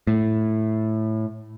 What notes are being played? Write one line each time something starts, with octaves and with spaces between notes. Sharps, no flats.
A2